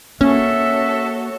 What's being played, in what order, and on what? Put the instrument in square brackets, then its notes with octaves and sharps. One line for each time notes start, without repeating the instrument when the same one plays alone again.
[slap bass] A#3 [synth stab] C#4 [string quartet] F#4 A4 C#5 [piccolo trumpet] E5